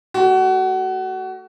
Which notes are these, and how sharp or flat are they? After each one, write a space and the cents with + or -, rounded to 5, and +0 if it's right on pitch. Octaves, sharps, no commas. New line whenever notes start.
A3 +0 F#4 +25